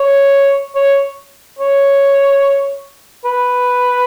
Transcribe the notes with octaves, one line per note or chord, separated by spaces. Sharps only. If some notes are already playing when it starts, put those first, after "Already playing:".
Already playing: C#5
C#5
C#5
B4